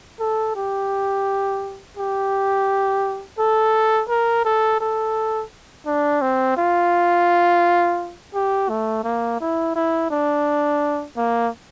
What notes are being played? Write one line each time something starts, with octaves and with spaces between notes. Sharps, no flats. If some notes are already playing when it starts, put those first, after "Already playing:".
A4
G4
G4
A4
A#4
A4
A4
D4
C4
F4
G4
A3
A#3
E4
E4
D4
A#3